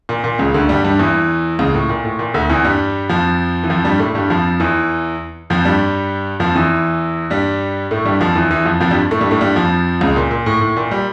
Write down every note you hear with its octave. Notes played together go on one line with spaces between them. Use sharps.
A#2
A#2
C#2 C#3
D2 D3
G2 G3
G2 G3
E2 E3
C#2 C#3
A2
A#2
A2
A#2
D2 D3
E2 E3
G2 G3
F2 F3
E3
F2 F3
G2 G3
A2 A3
G2 G3
F2 F3
E2 E3
F2 F3
G2 G3
F2 F3
E2 E3
G2 G3
A2 A3
G2 G3
F2 F3
E2 E3
E2 E3
F2 F3
F2 F3
G2 G3
A2 A3
G2 G3
A2 A3
G2 G3
F2 F3
C#2 C#3
A#2
A#2
A2
A2
A#2
G3